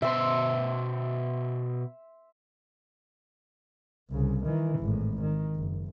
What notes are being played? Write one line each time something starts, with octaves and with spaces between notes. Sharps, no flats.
B2 C5 E5 C6
C2 C#3
D#3 E3
G#1 A2
D#3
F#1